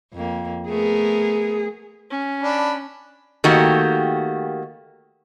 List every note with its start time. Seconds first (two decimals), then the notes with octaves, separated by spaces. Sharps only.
0.13 F2 A#3
0.69 A3 B3 G#4 A#4
2.10 C#4
2.43 D4 B5
3.44 D#3 A3 A#3 F#4 G4